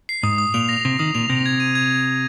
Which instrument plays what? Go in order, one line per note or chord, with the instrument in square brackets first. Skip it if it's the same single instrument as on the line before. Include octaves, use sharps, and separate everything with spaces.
[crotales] C7
[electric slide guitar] G#2 [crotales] D#6
[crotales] D#6
[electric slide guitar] A#2 [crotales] F7
[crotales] A#6
[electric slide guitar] C3 [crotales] D#6
[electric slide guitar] D#3 [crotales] D#6
[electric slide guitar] A#2 [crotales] F7
[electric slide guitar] C3 [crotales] A#6
[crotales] G#6
D#7
G#6